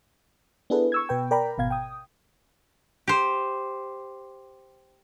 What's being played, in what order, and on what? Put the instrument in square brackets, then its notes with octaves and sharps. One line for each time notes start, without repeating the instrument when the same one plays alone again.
[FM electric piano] B3 D4 E4 G#4 A4 B4
C#6 E6 G#6
B2 B4 G5
A#4 D5 G5 A#5 B5
G#1 B2 F5 G#6
G5 D#6
[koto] G4 C5